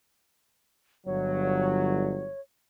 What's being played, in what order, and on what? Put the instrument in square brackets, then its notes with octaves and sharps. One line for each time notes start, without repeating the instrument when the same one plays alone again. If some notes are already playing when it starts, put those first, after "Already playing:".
[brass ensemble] G1 F#3 [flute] C#5